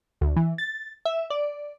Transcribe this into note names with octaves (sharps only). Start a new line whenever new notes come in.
D2
E3
A6
E5
D5